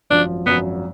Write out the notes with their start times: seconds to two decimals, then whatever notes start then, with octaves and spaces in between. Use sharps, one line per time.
0.10 G#1 F#2 F3 D4
0.46 G#1 F#2 F3 B3